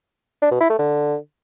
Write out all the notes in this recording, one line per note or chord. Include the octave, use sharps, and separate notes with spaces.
D4
B2
E4
A3
D3